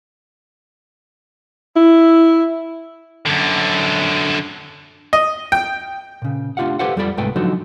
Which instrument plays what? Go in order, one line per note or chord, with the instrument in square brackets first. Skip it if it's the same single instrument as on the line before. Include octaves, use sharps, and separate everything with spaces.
[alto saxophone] E4
[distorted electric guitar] F#2 D3
[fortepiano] D#5
G5
[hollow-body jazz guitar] A#2 C#3
A3 D4 F4 G4 F5 F#5
G4 A4 B4 C5 F5 F#5
F2 G3 F4 A4 D5 B5
C2 G#2 G#3 A3 B4 G5
D3 F3 F#3 D#4 F#4 A4